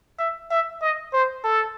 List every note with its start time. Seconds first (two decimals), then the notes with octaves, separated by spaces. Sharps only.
0.19 E5
0.51 E5
0.82 D#5
1.13 C5
1.44 A4